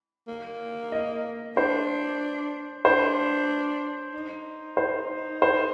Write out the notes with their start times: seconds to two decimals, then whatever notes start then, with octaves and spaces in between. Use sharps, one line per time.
0.28 A#3
0.92 D#5
1.56 D4 C5
2.85 D4 C5
4.14 D#4
4.77 C5
5.42 C5